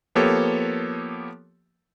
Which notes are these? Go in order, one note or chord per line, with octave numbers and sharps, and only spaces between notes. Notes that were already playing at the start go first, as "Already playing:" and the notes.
F3 A#3 B3 G4 A4 C#5